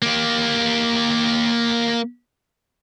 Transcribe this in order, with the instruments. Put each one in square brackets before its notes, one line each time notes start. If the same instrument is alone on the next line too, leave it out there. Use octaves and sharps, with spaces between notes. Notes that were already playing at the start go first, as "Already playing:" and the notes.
[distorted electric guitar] A#3 G4